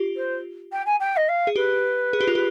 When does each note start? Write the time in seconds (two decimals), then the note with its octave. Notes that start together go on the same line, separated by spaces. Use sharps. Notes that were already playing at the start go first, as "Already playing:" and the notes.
Already playing: F4 G4
0.16 C5
0.72 G5
0.86 G#5
0.99 G5
1.16 D#5
1.28 F5
1.47 G#4
1.56 G4 B4
2.13 G#4
2.21 G4
2.28 F4
2.35 G4